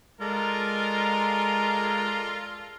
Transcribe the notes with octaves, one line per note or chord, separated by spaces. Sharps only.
G#3 F4 A4 A#4 D5 A#5